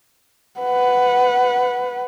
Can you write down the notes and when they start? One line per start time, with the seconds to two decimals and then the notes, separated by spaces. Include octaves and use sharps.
0.60 B4 F#5